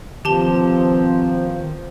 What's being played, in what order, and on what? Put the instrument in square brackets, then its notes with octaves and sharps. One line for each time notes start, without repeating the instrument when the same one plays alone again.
[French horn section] B2 A#3 C4 [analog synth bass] D#3 [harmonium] F3 [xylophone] G4 A5 G7